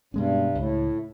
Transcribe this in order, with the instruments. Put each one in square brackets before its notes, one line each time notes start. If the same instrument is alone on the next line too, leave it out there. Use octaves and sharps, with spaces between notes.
[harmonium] G2 [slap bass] B2 G#3 C#4
[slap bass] C#2 [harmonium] A2